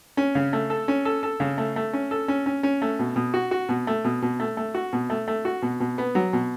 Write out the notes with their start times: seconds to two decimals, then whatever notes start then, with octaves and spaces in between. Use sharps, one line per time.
0.17 C#4
0.35 C#3
0.53 A3
0.70 A4
0.88 C#4
1.05 A4
1.23 A4
1.40 C#3
1.58 A3
1.76 A3
1.93 C#4
2.11 A4
2.28 C#4
2.46 C#4
2.63 C#4
2.82 A3
2.99 B2
3.16 B2
3.34 F#4
3.51 F#4
3.69 B2
3.87 A3
4.04 B2
4.22 B2
4.40 A3
4.57 A3
4.75 F#4
4.93 B2
5.10 A3
5.28 A3
5.45 F#4
5.62 B2
5.80 B2
5.98 B3
6.15 F#3
6.33 B2